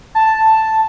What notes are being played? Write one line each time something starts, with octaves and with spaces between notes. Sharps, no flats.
A5